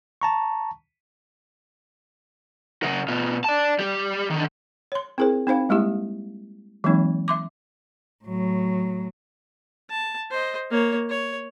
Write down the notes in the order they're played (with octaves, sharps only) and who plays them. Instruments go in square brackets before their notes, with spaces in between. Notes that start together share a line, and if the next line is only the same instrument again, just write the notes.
[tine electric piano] A5 A#5 C#6
[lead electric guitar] C#3 A#4
B2 F4
D5 A5
G3 G4
D3 D#3
[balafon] C#5 C6
C4 E4 G#4 A#4 C5
C4 D#4 C5 F5
G3 G#3 A#3 E4 G4
E3 F#3 G#3 A#3 C4 D#4
E5 C6 D6
[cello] A2 F#3
[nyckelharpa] A5
C5 D#5
A#3 C#5
C#5